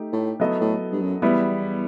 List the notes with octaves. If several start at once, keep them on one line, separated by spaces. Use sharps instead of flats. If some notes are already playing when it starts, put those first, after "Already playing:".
Already playing: A3 D#4 G4
A2
F#3 B3 E4 A4 D#5
A2
G2
F#2
E2 G3 B3 E4